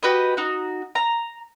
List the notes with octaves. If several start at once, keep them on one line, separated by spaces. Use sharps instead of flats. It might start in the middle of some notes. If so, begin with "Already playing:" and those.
F#4 G4 B4 D#5
D#4 F#4
A#5